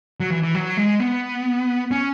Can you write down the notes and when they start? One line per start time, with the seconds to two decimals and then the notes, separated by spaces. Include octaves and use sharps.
0.20 F#3
0.32 E3
0.43 E3
0.54 F#3
0.77 G#3
1.00 B3
1.91 C#4